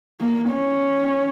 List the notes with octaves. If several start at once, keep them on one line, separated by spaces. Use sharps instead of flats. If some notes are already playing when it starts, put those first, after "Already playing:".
A#3
C#4